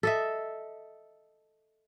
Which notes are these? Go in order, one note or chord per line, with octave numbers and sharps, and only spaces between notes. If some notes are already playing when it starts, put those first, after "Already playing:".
A4 D#5 E5